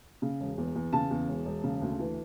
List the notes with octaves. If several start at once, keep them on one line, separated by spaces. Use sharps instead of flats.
C#3
E1
E2
E2
C#3 A5
E2
E1
E1
C#3
D2
E3